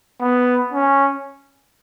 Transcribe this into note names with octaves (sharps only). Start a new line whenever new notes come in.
B3
C#4